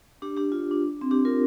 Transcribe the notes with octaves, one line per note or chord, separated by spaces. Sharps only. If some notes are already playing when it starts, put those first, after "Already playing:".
D4 G4
D4 G4
F4
D4
C4
D4 G4
F4 A#4